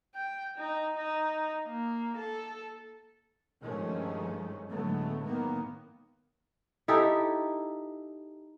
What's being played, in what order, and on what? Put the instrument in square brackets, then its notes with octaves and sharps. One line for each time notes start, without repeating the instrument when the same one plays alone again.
[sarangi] G5
D#4
D#4
A#3
A4
[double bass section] G2 D#3 F3 G#3 A3 C#4
A2 D3 F#3 G#3 A3 B3
A2 D#3 A#3 B3
[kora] D#4 E4 G4 A4